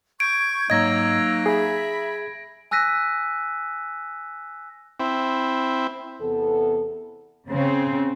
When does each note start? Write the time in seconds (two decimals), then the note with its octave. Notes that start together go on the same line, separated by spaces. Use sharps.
0.20 C#6 G6 G#6 D7
0.70 G#2 F#3 A#3 D#4 D#5 E6 G#6 A#6
1.46 G#4 E5 B5
2.71 G#5 E6 F#6 A#6 B6 D#7
5.00 C4 E4
6.21 E2 C3 B3 A4
7.49 C#3 C4